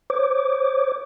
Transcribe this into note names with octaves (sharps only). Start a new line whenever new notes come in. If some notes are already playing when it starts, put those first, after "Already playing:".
C5 C#5 D6